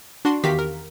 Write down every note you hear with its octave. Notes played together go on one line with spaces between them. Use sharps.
D4 F#4 C6
E2 D#3 F#4 G4 F5 B6
A#4